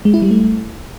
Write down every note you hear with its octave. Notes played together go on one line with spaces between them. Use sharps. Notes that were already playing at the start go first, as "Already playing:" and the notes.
G#3
E4
G3
A3